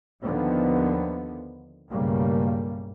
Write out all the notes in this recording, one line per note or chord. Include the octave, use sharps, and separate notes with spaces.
D#2 D3 D#3 F3 B3
B1 G2 C#3 G3 A3 A#3